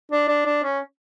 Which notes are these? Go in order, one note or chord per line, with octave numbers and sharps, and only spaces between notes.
D4
D4
D4
C#4